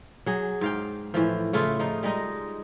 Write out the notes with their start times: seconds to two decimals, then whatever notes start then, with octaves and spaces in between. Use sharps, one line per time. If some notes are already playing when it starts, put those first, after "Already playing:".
0.26 F#3 G#4
0.61 G#2 F5 G5
1.14 A2 E3 F3
1.53 C#3 A3 E4 F4
1.80 F3 D#4
2.03 G3 G#3 D#4 D#5